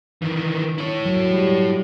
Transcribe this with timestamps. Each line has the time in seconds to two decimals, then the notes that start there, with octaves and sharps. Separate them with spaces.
0.22 D#3 E3
0.78 E4 C#5
1.05 F#3
1.31 G3